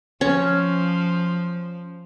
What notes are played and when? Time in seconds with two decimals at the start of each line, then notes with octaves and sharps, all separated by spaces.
0.21 F3 C#4